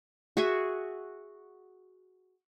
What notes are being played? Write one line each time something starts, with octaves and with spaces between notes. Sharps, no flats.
F#4 G#4 E5 G#5